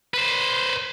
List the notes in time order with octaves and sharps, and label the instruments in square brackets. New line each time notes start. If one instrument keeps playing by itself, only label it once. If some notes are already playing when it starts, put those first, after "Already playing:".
[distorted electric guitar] B4 C5